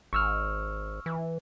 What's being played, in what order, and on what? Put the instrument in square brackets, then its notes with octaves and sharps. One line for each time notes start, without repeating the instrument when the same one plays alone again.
[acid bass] G#1 [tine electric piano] C#6 E6 F6
[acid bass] E3